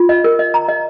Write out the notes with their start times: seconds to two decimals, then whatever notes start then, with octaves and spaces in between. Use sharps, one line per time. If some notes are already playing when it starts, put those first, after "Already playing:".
Already playing: F4
0.09 D#5
0.24 A#4
0.39 D#5
0.54 A#5
0.68 D#5